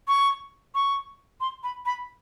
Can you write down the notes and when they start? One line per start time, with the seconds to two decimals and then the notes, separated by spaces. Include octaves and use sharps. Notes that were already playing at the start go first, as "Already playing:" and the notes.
0.08 C#6
0.75 C#6
1.41 C6
1.63 B5
1.86 B5